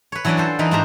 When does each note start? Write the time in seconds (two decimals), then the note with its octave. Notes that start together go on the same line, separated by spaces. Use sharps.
0.12 B4 C#5
0.25 E3 F#3 C#4 D4 B4 D5
0.37 F4 A4 C5
0.59 E3 D#4 A#4 B4
0.71 G#2 A#3 D4 G4 C5 A#5